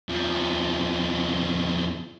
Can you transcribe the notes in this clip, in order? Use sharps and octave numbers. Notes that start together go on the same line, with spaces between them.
E2 F3